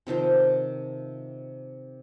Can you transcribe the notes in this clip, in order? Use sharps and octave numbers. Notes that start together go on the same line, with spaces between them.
C3 D#3 F3 C5